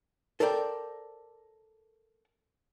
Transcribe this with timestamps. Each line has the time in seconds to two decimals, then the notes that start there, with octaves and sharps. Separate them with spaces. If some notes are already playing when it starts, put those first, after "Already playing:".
0.40 A4 A#4 C5 D5 F#5 G5